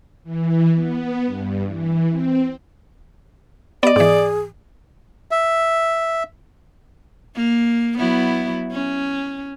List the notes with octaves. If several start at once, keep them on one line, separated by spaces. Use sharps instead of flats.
E3
B3
G2
E3
C4
B3 G4 D5 D#5
G#2 E3 G#4
E5
A#3
F#3 B3 E4
C#4